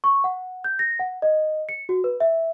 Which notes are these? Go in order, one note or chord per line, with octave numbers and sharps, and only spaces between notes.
C#6
F#5
G6
A#6
F#5
D#5
C#7
F#4
B4
E5